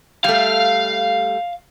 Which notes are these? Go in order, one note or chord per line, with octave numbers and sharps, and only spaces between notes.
G3 A3 F5